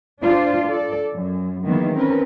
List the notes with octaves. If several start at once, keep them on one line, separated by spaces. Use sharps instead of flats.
D4 F4 C5 D5
A4 D5
F#2
D#3 E3 F#3 G#3 A#3 B3
C4 C#4 A#4 B4